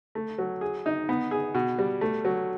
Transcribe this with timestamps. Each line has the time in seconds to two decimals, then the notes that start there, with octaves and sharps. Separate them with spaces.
0.15 A3
0.38 F#3
0.61 G#4
0.86 D#4
1.09 B3
1.31 G#4
1.55 B2
1.78 G3
2.01 A3
2.25 F#3